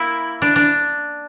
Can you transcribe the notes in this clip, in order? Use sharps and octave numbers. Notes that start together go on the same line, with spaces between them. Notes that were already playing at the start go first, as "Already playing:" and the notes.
Already playing: A#3 E4
D4
D4